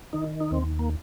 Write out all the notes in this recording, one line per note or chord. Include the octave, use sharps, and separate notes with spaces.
D#3 D#4
D#4
D#2 C4
A#3